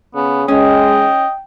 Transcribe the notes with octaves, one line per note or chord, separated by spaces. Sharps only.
C#3 B3
G#3 C#4 D#5 G5